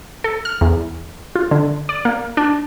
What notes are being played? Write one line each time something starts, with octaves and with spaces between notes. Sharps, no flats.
A4
F6
E2
F4
D3
D5
A#3
D4